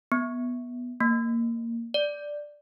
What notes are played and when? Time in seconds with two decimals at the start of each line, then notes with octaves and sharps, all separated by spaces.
0.12 B3
1.00 A#3
1.94 D5